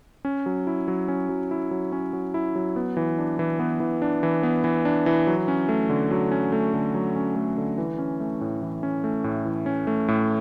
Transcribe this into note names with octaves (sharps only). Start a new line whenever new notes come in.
C#4
F#3
E4
F#3
C#4
F#3
E4
F#3
C#4
F#3
E4
F#3
B3
E3
D4
E3
B3
E3
D4
E3
B3
E3
D4
E3
F#3
C#4
A3
D3
F#3
C#4
A3
D3
F#3
C#4
A3
D3
E3
C#4
A3
A2
E3
C#4
A3
A2
E3
C#4
A3
A2